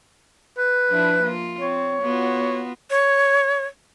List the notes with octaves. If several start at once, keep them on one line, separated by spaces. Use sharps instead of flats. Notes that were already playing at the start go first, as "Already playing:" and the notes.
B4
F3 D4 E4
A#3 F4
C4 C#5
B3 F4 F#4
C#5